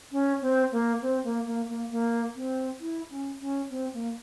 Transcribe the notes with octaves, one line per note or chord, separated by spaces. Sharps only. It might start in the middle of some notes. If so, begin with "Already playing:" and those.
C#4
C4
A#3
C4
A#3
A#3
A#3
A#3
C4
E4
C#4
C#4
C4
A#3